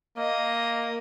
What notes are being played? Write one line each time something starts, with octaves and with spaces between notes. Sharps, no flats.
A#3 D#5